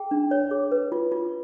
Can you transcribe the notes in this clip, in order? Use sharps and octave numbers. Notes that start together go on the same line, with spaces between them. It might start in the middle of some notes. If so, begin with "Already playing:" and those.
Already playing: G#4 G5
D4
C#5
G#4
B4
F4
F4